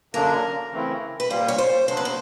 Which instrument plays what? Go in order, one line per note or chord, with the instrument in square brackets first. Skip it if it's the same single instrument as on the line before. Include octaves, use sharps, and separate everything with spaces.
[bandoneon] F#2 D3 F#3 A#3 D4 [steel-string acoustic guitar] A#4
[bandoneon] C#3 E3 A3 C4 E4
[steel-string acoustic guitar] B4
[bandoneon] A#2 G3 A#3 [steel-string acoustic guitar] C5
[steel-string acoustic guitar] C#5
C5
[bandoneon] D#2 C#3 F#3 B3 D4 [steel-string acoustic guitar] C5
[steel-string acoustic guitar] B4
C5